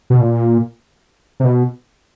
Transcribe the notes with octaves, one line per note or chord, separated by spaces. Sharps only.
B2
A#2
C3
B2